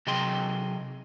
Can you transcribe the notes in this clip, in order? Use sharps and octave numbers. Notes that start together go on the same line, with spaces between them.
C3 F#3 G#4 D#5 G5 C6